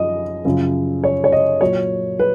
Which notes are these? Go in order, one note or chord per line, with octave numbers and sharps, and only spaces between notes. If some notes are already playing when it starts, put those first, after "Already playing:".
Already playing: F#2 F3 D#5
F#2 C#3 F3
C#5
C#5
D#5
A#2 F#3 C#5
B4